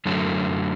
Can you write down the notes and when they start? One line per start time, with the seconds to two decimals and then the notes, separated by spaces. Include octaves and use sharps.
0.06 F#2 D3 F#3 A3